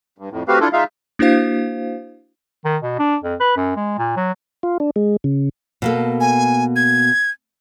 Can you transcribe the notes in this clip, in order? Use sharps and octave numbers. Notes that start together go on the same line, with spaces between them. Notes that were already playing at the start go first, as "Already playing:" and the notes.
G2
F2 A2
A3 C4 F#4 G4 B4 F5
D4 E4 F4 A4
G#3 D#4 F4 E5 F5
A#3 D4 E4 F#4 C5 F5
D#3
B2
D4
F2
B4
F#2
G#3
A#2
F#3
F4
D4
G#3
C#3
B2 A#3 A4
G#5
G#6